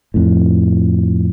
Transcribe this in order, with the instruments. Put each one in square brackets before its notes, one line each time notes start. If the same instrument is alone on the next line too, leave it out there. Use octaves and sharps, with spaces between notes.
[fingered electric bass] F2 A2